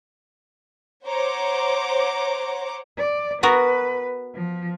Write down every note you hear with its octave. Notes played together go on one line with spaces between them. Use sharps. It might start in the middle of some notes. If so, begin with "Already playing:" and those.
C5 C#5 F#5 A#5 D6
D5
B3 F#4 A#4 B4
F3